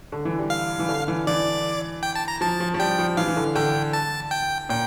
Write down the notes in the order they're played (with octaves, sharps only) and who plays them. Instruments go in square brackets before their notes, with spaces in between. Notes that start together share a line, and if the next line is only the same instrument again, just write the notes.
[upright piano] D3
E3
G3
[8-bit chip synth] F5
[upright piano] E3
D3
E3
[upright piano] E3 [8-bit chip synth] D5
[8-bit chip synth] G5
A5
A#5
[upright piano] F3 [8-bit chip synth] A5
[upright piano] F3
F3
[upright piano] G3 [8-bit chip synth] G5
[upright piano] F3
[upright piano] E3 [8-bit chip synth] F5
[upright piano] E3
D3
[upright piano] D3 [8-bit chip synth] G5
[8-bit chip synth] A5
G5
[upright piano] A#2 [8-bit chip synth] G5